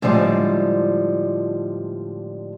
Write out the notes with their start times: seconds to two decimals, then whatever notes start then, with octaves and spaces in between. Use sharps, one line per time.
0.02 A2 D3 F3 G3 G#3